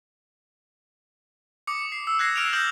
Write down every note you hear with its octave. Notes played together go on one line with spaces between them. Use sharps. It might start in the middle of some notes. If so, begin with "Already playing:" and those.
D6 D#6 C#7
C7
E6
F#6 G#6 A#6 C7
E6 F6 D7 E7 F7
D#6 F6 G6 A#6 F#7